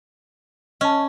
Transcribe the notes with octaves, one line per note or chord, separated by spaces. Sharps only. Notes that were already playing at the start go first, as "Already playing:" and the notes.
C#4 D#5 A5